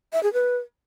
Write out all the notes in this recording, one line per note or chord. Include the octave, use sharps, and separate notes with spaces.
E5
G#4
B4